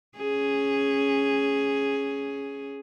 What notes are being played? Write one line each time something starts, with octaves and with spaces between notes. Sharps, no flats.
C#4 G#4